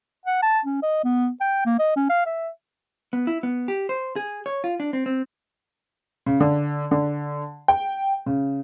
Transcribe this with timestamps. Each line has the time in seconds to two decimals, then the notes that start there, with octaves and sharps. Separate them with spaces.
0.25 F#5
0.43 A5
0.65 C#4
0.83 D#5
1.04 B3
1.41 G5
1.65 A#3
1.79 D#5
1.96 C#4
2.10 F5
2.26 E5
3.13 B3
3.27 E4
3.43 B3
3.68 G4
3.89 C5
4.16 G#4
4.46 C#5
4.64 F4
4.80 D4
4.93 C4
5.06 C4
6.26 C#3
6.40 D3
6.91 D3
7.68 G5
8.26 C#3